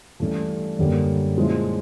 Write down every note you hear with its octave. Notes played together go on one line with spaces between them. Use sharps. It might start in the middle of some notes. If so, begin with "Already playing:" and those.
G2 E3 A3 C#4
F#2 D3 G3 A#3
A#2 F3 G#3 C#4 E4